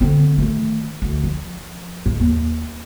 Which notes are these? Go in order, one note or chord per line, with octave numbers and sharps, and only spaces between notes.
D3 C4
D#3 A3
D2
F3
C#2 G#2
D#2